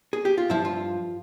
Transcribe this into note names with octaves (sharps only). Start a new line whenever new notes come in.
G#4
G4
F4
G2 F3 E4
F4